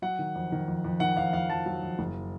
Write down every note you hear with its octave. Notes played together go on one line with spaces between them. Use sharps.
F#3 F#5
D#3
F2
D#3
F2
F2
D#3 F#5
F2 F5
F2 F5
F2 A5
F#3
F2
F#1